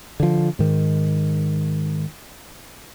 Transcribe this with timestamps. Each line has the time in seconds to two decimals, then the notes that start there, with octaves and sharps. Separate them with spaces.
0.20 D3 F3
0.59 G#2 D#3